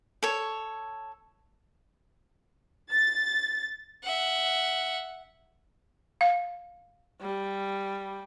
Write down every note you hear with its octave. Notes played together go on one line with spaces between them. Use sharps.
A4 C#5
A6
E5 F#5
F5
G3